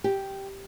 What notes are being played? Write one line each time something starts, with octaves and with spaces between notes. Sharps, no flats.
G4